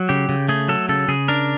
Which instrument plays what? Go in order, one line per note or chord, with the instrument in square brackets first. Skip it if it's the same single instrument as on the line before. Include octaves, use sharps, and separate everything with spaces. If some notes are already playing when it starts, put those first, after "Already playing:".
Already playing: [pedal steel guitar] F#3
C#3 G4
C#3
A3 G#4
F#3 A4
C#3 A4
C#3 G#4
D4 A#4